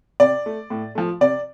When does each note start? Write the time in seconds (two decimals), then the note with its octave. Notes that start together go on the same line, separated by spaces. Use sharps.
0.20 C3 D5
0.46 A3
0.70 A2
0.95 F3 A3
1.21 C3 D5